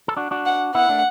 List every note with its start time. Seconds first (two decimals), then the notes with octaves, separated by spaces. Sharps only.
0.08 A4
0.17 D4 F#4
0.31 D4 F#4
0.46 F#5
0.75 B3 E4 F#5
0.89 A3 D4